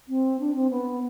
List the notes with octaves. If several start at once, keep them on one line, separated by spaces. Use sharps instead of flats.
C4
D4
C4
B3